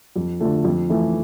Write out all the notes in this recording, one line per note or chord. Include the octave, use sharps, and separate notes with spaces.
F2
D3 F3 A3
F2
E3 A3